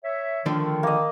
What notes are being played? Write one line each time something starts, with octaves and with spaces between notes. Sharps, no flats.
C#5 E5
D3 D#3 F3 A3
A#3 D#5